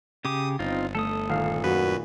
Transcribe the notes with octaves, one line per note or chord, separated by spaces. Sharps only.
C#3 G4 D6 D#6
G1 C4 D#4 F4
A3 A4 D#6
D#1 F5 C7
F#2 A#2 F#4 B4